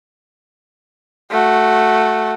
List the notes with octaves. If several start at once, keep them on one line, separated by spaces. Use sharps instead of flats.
A3 F#4